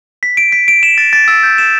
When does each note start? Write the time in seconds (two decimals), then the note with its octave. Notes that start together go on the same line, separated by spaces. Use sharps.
0.23 B6
0.37 D7
0.52 B6
0.68 D7
0.83 E7
0.98 A6
1.13 A6
1.28 E6
1.43 G6
1.58 E7